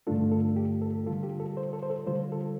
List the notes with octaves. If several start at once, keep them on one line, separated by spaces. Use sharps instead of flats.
G2 D3 A3 D4 F4 A4
A4
G4
A4
D3 G3 F4 A4
G4
A4
C5
A4
C5
A4
D3 G3 F4 C5
A4